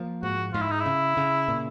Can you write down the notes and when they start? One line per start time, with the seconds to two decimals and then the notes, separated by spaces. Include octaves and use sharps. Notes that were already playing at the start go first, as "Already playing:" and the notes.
Already playing: F3 A#3
0.23 G#2 F#4
0.54 G#2 F4
0.62 E4
0.71 D#4
0.80 E4
0.86 C#3
1.17 C#3
1.48 A#2